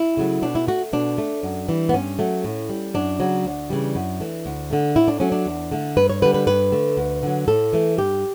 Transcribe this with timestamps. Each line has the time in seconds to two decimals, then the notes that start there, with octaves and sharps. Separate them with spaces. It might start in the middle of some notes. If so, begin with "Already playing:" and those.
Already playing: E4
0.17 C#3 F#3 A3
0.42 B2 D4
0.55 E4
0.67 A3 F#4
0.93 B2 D4
1.18 A3
1.43 F#2
1.69 E3 G3
1.89 B3
1.94 G2 C#4
2.19 F#3 A3
2.44 A2
2.69 G3
2.94 F#2 D4
3.20 C#3 F#3
3.45 D2
3.70 C#3 E3 G3
3.95 F#2
4.21 E3 A3
4.46 D2
4.70 D3 A3
4.96 A2 E4
5.08 D4
5.20 F#3 A3 C#4
5.32 D4
5.46 E2
5.72 D3 A3
5.97 G2 B4
6.10 C#5
6.22 D3 B4
6.26 G3
6.34 B4
6.47 G2 B4
6.72 D3 A3
6.97 D2
7.23 D3 F#3
7.48 A2 A4
7.73 E3 A3
7.98 G2 G4